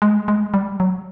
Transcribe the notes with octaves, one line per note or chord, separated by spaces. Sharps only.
G#3
G#3
G3
F#3